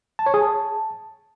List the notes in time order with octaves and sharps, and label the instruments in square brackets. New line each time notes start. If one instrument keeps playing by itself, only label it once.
[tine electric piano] A5
C#5
G#4
A5